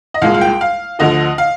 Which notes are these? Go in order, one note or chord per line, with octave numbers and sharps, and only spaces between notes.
D#5
C2 A#2 G#3 F5
F5
G5
F5
D2 D3 F3 D#5
F5